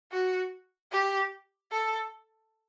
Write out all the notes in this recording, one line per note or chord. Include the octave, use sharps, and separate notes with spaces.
F#4
G4
A4